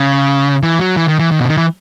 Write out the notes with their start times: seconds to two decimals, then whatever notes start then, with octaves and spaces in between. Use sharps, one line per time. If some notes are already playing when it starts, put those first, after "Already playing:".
Already playing: C#3
0.63 E3
0.79 F#3
0.96 E3
1.08 D#3
1.19 E3
1.31 D#3
1.40 B2
1.45 C#3
1.49 D#3
1.57 E3